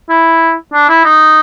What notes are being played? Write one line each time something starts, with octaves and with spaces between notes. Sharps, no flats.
E4
D4
E4
D#4